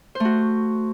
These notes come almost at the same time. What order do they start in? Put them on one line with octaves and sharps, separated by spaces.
C5 A3 F#4